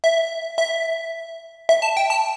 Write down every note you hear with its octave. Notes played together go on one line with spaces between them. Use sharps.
E5
E5
E5
A5
G5
A5